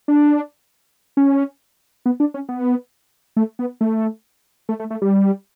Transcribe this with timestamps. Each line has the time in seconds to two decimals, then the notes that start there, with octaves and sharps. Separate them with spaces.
0.08 D4
1.17 C#4
2.06 B3
2.20 D4
2.34 C#4
2.49 B3
3.36 A3
3.59 B3
3.81 A3
4.69 A3
4.80 A3
4.90 A3
5.02 G3